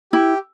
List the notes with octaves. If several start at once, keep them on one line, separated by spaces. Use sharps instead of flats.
E4 G4